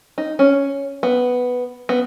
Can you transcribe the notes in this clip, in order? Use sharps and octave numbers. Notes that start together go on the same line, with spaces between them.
D#4
C#4
B3
B3